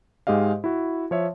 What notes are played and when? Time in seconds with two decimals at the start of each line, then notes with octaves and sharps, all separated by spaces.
0.27 G#2 G#3 G4 D#5 F5
0.64 E4 F#4
1.11 F3 C#5 E5